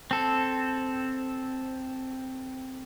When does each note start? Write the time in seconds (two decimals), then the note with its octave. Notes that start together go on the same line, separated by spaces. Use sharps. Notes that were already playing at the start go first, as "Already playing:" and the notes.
0.11 C4 A4